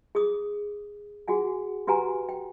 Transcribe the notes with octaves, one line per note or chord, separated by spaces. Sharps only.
G#4 C#6 D#6
F#4 G#4 F#5 G#5
F#4 G4 B4 F#5 G#5 A#5
G5